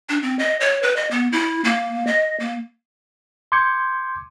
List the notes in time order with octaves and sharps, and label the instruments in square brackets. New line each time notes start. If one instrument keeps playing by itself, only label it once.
[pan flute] D4
C4
D#5
C#5
B4
D#5
B3
E4
A#3
D#5
A#3
[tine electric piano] C6 D6 G6 G#6 C#7